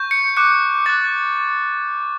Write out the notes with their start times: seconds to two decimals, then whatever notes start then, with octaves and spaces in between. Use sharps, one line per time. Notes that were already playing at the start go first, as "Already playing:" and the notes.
Already playing: C#6 G6
0.11 C#7
0.37 D6 F#6 C#7
0.86 D6 F#6 A6